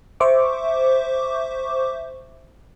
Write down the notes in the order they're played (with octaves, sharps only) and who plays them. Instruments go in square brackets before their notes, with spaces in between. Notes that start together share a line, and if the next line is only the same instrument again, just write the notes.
[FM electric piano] C5 E5 C#6 D6